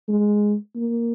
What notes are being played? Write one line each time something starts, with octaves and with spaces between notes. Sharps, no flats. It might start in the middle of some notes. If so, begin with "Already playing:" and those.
G#3
A#3